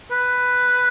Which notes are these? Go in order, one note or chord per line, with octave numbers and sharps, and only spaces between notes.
B4